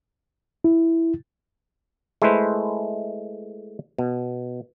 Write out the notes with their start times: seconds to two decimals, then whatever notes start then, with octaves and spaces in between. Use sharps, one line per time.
0.64 E4
2.22 G#3 A3 E4 B4 C5
3.99 B2